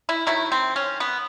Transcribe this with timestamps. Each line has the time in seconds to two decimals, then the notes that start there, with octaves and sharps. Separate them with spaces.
0.09 E4
0.27 D#3 F#3 A3 E4
0.52 C4
0.76 C#4
1.00 B3